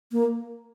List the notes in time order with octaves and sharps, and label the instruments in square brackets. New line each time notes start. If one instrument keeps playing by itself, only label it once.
[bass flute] A#3